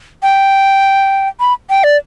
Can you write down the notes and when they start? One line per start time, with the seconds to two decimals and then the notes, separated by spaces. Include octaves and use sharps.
0.23 G5
1.40 B5
1.70 G5
1.84 D5